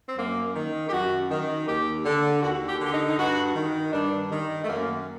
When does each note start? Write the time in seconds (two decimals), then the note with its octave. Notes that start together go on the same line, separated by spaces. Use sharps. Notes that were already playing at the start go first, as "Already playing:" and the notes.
0.08 C4
0.17 F#2 A#3
0.55 D#3
0.88 G4
0.92 F#2 F#4
1.30 D#3
1.67 D#2 G4
2.05 D3
2.43 D#2 F#4
2.68 G4
2.80 D3 G4
2.92 D#4
3.06 D#4
3.18 G2 F#4
3.55 D#3
3.93 G2 D4
4.31 D#3
4.64 A3
4.68 F#2 A#3